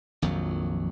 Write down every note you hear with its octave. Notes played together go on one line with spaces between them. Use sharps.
A#1 F2 D#3 F#3